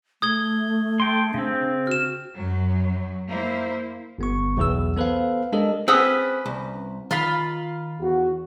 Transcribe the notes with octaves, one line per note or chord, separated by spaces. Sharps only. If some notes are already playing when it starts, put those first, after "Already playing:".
A3 D#6 G#6 G7
A4 G5 C6
C#3 C4 D4
F#4 F6 E7
F#2 F#3
A#3 E4 C5
G1 B3 C#6
B1 E2 E3 G#4 E6
B3 A4 B4 C5 F5
G#3 D4 G4 A4 A#4 D#5
C4 C#4 G#4 B4 F#5 D#6 E6
C2
D#3 F4 F5 B5
E2 F#4